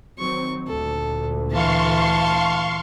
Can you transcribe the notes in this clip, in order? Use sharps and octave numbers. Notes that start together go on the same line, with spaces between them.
D#3 F#3 C4 C#6
D2 A#2 A4
E3 F5 A5 C6 C#6